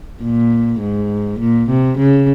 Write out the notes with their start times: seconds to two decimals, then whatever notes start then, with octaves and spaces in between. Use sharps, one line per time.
0.23 A#2
0.80 G#2
1.39 A#2
1.69 C3
1.98 C#3